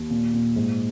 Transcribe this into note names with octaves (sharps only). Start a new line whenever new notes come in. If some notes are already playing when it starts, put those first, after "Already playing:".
Already playing: D#2
A#2
A#2
G#2